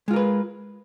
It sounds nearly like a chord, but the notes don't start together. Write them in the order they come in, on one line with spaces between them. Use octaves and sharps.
G#3 F4 A#4 B4